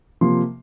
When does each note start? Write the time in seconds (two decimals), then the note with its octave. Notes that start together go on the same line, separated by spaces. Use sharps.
0.21 C3 F3 A#3 C6